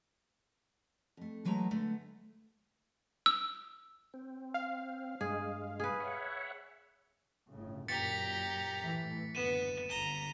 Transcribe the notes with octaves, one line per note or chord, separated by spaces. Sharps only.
F2 A3
E3 F#3 G#3 A3 A#5
D3 G#3 A3 B3
E6
C4
F5
G2 G#3 G#4
G#4 B4
C#5 E5 F#5
G1 A2 C#3
F#2 A#2 G4 A#5 A6 B6 C#7
A2 E3 A3
F#1 D2 B3 D#7 E7
G1 D3 A#5 D#7 E7 G7